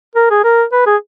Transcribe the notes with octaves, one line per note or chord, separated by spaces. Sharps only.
A#4
G#4
A#4
B4
G#4